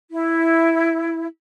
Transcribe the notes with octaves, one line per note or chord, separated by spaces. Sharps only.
E4